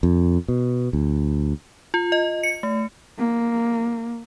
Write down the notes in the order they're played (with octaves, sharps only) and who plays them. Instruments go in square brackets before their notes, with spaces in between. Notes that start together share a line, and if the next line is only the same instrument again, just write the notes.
[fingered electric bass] F2
B2
D2
[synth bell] F4
D#5
C#7
A3
[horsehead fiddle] A#3